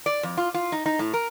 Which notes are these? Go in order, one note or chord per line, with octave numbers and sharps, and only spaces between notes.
D5
F2
F4
F4
D#4
D#4
A2
A#4